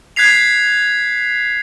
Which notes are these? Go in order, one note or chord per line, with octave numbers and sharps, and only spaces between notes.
F#6 G#6 B6 C7 F7